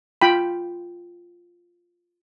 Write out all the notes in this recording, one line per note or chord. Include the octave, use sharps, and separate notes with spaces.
F4 G5 B5